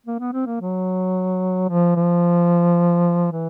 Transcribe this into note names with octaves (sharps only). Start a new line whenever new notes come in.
A#3
B3
C4
A#3
F#3
F3
F3
E3